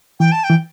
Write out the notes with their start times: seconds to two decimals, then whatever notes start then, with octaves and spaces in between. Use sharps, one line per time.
0.20 E3 G5
0.32 A5
0.44 G5
0.50 E3